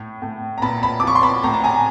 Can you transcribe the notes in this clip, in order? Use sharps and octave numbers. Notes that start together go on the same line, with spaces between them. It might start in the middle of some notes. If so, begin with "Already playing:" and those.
Already playing: A2
A2
A#5
A#2 A5 B5
A5 B5
D6
F3 C#6
C6
A5 B5
A2 A#5
A5
G#5 A#5